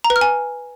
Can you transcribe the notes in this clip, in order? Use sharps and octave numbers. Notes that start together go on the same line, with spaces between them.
A#5
B4
F6
G#5